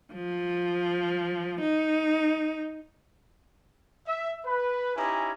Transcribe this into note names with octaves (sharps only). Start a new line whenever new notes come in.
F3
D#4
E5
B4
C#4 D#4 E4 G4 G#5 A#5